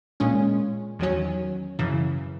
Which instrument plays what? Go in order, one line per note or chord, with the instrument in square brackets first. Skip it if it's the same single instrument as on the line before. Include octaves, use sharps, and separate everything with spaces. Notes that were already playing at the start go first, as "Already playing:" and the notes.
[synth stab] A#2 G#3 C#4
E2 D#3 F#3 C#4
F#2 C#3 E3